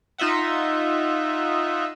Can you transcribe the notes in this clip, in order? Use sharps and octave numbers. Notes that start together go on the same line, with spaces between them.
D#4 F4 D#5 E5 F#5